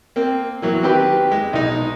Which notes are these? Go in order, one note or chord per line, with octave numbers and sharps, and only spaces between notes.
A#3 C4
E3 F#3 A#3
D#3 C4 G4 B4
G#3
B1 D#4